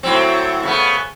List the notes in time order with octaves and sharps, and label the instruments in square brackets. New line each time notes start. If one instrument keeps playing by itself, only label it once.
[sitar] A2 F#3 C4
C#3 A3 B3